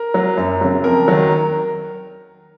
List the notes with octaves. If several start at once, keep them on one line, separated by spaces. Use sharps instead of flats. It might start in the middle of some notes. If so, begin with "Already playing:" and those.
Already playing: A#4
F#3
F#2
C#3 F#3
F2 A#4
D#3 F#3